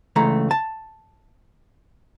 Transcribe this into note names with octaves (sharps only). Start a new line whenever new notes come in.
C#2 E3 A3 A#5
A5